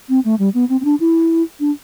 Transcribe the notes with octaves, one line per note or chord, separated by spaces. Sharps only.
C4
A3
G3
B3
C4
C4
D4
E4
D4